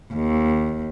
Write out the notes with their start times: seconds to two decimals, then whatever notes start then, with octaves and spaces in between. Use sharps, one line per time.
0.14 D#2